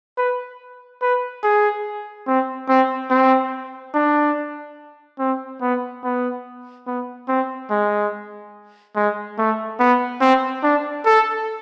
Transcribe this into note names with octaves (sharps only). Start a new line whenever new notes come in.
B4
B4
G#4
C4
C4
C4
D4
C4
B3
B3
B3
C4
G#3
G#3
A3
B3
C4
D4
A4